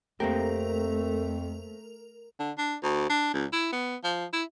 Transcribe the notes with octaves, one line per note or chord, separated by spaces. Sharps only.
F2 A3 A#3 C4 G4 A#4
D3
D4
D2
D4
C#2
E4
B3
F3
E4